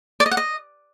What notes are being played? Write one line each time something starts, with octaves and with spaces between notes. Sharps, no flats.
D5
D#5
F#5
D#5